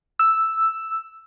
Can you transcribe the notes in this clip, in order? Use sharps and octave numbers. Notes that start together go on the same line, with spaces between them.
E6